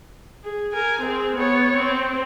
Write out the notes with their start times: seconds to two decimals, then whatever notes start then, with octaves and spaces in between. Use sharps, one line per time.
0.44 G#4
0.73 A#4 G#5
1.01 C4 G#4
1.36 B3 C#5
1.77 C4